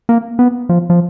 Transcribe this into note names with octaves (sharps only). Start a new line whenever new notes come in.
A#3
B3
F3
F3